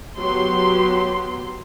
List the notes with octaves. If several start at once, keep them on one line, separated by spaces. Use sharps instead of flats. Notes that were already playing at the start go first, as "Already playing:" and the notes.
F#3 B3 G4 C6